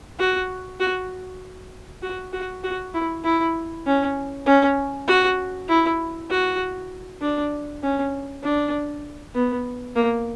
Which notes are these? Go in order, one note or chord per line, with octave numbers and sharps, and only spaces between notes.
F#4
F#4
F#4
F#4
F#4
E4
E4
C#4
C#4
F#4
E4
F#4
D4
C#4
D4
B3
A#3